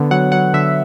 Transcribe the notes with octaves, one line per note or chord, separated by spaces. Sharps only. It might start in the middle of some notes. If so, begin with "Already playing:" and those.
Already playing: D3 B3
F#3 F#5
F#3 F#5
D3 E5